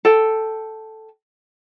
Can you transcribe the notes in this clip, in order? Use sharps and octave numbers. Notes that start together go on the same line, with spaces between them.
A4 G5